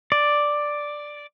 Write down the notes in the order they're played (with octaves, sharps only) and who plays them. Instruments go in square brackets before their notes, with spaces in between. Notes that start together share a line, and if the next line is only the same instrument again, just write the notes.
[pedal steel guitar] D5